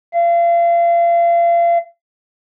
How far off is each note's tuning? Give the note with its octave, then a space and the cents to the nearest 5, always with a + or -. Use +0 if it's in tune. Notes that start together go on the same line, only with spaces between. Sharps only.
F5 -35